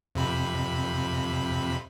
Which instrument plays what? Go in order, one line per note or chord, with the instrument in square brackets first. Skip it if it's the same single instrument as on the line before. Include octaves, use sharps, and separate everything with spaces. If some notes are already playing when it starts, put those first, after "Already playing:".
[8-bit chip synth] F2 C3 B5